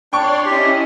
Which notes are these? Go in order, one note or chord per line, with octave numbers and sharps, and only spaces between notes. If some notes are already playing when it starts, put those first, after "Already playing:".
D4 C#5 D5 G5 C6 C#6
C#4 E4 G4 D#5